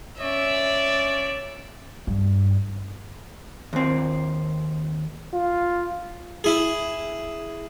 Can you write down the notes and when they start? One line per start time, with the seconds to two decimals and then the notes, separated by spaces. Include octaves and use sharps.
0.21 C#4 C#5 D5 E5
2.07 G2
3.73 D#2 C4
5.33 F4
6.44 E4 G#4